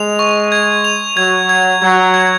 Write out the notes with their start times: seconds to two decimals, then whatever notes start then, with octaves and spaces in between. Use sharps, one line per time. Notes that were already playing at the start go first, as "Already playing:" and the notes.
Already playing: G#3 F7
0.19 C#6
0.52 G#6
0.84 F7
1.16 F#3 G#6
1.49 G#6
1.81 F#3 G#6
2.14 G#6